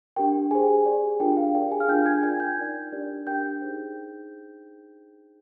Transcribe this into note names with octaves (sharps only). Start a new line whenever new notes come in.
D4 G4 A#4 G5
G4 G#4 C5 G#5
G4 D5
D4 F4 A#4 G5
G5
F5
G4 A#4 D5 G5
G#4 G#5
F5 F6
D4 F4 A#4 G5 G6
G#5 G#6
F4 A#4 D5 G#5 G#6
G5 G6
D#4 A#4 D5
D4 G4 A#4 D5
D4 G4 A#4 G5 G6
D#4 G#4 C5